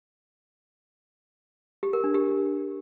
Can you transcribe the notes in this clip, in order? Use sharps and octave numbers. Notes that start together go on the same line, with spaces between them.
G4
A#4
D4
G4